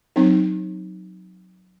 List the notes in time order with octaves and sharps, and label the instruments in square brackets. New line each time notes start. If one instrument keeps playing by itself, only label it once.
[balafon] F#3 C4 D#4